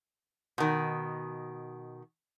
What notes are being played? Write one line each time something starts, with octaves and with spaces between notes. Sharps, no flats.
B2 D#3